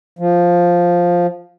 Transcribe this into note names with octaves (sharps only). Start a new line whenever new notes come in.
F3